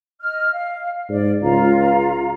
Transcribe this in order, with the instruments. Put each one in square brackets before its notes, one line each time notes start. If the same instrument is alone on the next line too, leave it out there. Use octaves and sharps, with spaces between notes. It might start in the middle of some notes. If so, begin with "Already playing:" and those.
[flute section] D#5 F6
F5
[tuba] G#2 [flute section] D5
[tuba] C#2 [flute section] F4 F5 A#5